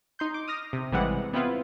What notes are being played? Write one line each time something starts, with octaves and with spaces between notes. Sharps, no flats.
D#4 C6 G6
D6
D#6 F6 A#6
C3
A1 C3 E3 G3 G#3 F#5
B3 C4 E4 F4 B4